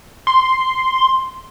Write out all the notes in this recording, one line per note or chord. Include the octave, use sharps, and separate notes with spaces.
C6